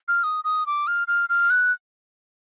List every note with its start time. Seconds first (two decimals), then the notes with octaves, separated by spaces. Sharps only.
0.08 F6
0.24 D#6
0.44 D#6
0.67 D6
0.87 F6
1.08 F6
1.29 F6
1.50 F#6